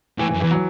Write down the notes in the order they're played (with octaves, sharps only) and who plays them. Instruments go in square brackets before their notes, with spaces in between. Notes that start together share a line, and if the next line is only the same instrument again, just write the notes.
[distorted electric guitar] A2 [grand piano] E3
[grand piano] E3
[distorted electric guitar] F#2
[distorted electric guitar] E2 [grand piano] E3
[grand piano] F#3